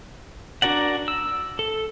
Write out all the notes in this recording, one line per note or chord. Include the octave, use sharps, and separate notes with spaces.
D4 F#4 A#4 D5 F#5
E6
A4